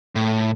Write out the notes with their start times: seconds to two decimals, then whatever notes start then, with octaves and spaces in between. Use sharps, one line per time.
0.15 A2